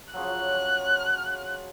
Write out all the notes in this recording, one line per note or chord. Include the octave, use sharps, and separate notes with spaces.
C#3 F3 F#3 F#6